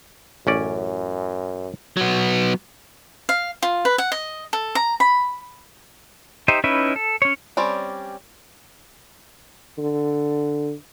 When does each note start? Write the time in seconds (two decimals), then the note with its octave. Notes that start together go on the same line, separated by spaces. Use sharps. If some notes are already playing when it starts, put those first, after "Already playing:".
0.47 A1 F#2 C#4 D5
1.97 F#3 B3
3.29 F5
3.62 F4
3.85 B4
3.98 F#5
4.12 D#5
4.53 A4
4.75 A#5
5.00 B5
6.48 D#4 G4 C5 D#5 E5
6.64 C#4 D#4 E4 B4 E5
6.96 A4
7.22 C#4 C#5
7.57 G3 C4 C#4 D5
9.78 D3